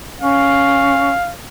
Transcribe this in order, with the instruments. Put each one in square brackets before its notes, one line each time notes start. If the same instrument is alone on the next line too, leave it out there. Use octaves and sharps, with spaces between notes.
[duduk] C#4 [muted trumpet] F5